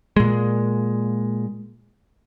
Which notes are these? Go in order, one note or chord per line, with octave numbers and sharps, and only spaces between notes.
A#2 G#3